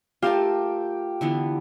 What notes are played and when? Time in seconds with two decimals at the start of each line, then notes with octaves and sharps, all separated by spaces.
0.22 A3 F4 G4 A#4 G5 A5
1.21 D3 E3 B3